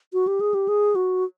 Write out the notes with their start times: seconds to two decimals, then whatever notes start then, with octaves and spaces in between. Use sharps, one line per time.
0.13 F#4
0.27 G4
0.41 G#4
0.54 G4
0.68 G#4
0.95 F#4